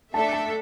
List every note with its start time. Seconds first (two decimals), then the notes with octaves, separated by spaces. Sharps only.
0.14 A3 D4 A4 E5 A5
0.33 A5